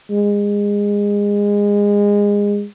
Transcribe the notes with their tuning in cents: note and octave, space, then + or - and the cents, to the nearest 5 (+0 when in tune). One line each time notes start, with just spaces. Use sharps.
G#3 -25